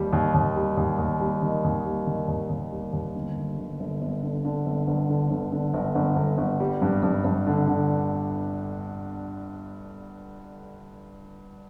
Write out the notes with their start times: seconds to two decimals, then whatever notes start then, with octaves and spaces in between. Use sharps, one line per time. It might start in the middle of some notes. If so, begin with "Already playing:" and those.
Already playing: D#2 G3
0.13 D#2
0.34 D#2
0.56 G3
0.77 D#2
0.99 D#2
1.20 G3
1.42 D#3
1.64 D#2
1.85 G3
2.07 D#3
2.28 D#2
2.50 D#2
2.72 G3
2.93 D#2
3.15 G1
3.36 G1
3.59 G1
3.80 G1
4.02 G1
4.23 D3
4.45 D3
4.66 G1
4.87 G1
5.09 D3
5.30 G1
5.52 D3
5.74 G1
5.95 G1
6.16 G1
6.38 G1
6.60 G3
6.82 G2
7.03 G2
7.25 G2
7.47 D3
7.68 D3